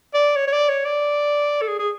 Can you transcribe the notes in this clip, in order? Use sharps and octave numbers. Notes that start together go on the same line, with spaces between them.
D5
C#5
C#5
D5
C#5
D5
A4
G#4
G#4